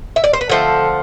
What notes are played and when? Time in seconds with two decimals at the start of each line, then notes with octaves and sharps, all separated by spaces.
0.16 E5
0.24 D5
0.33 C5
0.41 B4
0.49 D3 F3 A3 C4 A4